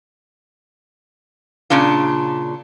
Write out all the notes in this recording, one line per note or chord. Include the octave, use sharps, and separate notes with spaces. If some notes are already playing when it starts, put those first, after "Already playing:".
A#2 C#3 D4 F4